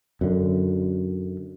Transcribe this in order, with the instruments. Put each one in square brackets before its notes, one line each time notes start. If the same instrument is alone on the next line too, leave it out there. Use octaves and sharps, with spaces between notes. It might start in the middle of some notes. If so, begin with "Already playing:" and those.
[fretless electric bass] F#2 D3